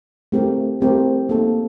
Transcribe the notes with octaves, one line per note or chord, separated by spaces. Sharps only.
A3 C4 G4 A#4
A3 C4 G4 A#4
A#3 D#4 A4